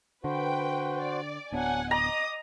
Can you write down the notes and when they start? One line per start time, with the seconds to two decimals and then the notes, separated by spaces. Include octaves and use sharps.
0.24 D3 F#4 B4 C5 G5
1.00 D5
1.52 D1 F#3 B3 D4 F#5 G#5
1.91 D#5 A#5 D6 D#6